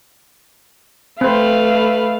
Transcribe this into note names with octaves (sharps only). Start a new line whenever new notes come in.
A3 C4 B4 C5 F5 B5